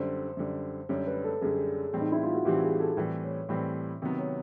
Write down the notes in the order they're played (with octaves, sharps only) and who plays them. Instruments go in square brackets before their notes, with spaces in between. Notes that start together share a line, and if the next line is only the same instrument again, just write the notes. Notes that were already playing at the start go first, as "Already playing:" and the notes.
Already playing: [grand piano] F#2 D3 G3 [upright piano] C5
[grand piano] F#2 D3 G3
[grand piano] F#2 D3 G3 [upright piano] C#5
[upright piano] B4
A4
[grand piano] F#2 D3 G3 [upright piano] G#4
[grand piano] A2 E3 G3 C4
[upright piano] D#4
E4
F4
F#4
[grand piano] A2 E3 G3 C4 [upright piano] G4
[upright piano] G#4
A4
[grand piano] A2 E3 G3 C4 [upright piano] B4
[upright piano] C#5
[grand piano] A2 E3 G3 C4
C3 D#3 F#3 B3
[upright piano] C#5